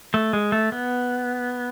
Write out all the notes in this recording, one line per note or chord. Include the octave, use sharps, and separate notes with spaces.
A3
G#3
A3
B3